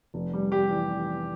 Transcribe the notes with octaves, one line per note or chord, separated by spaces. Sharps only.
F1
G3
G3 G4
E3